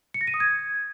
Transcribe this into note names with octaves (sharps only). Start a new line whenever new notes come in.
C#7
A#6
D#7
D#6
G#6